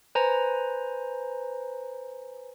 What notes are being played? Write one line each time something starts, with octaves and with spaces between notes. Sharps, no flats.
B4 C5 G#5 A#5 A#6